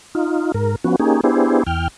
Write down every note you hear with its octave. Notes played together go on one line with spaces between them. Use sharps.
D#4 F4
G#2 A#4
F3 B3 C#4 F#4
A#3 C#4 D#4 G4 G#4
B3 D4 E4 G4 G#4 C5
E2 G5 F6